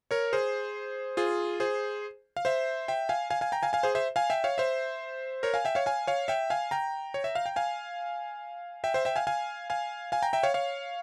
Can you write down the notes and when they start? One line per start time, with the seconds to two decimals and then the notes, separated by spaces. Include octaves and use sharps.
0.11 A#4 C#5
0.33 G#4 C5
1.17 F4 G#4
1.60 G#4 C5
2.37 F5
2.45 C5 E5
2.88 E5 G5
3.09 F5 G#5
3.30 F5 G#5
3.41 F5 G#5
3.52 G5 A#5
3.63 F5 G#5
3.73 F5 G#5
3.83 G#4 C5
3.95 C5 E5
4.16 F5 G#5
4.30 E5 G5
4.44 C#5 F5
4.58 C5 E5
5.43 A#4 C#5
5.54 F5 G#5
5.65 E5 G5
5.75 C#5 F5
5.86 F5 G#5
6.07 C#5 F5
6.28 E5 G5
6.50 F5 G#5
6.71 G5 A#5
7.14 C#5
7.24 E5
7.35 F5
7.46 G5
7.56 F5 G#5
8.84 E5 G5
8.94 C5 E5
9.05 E5 G5
9.16 F5 G#5
9.27 F5 G#5
9.70 F5 G#5
10.12 F5 G#5
10.22 G5 A#5
10.33 E5 G5
10.43 C#5 F5
10.54 C#5 F5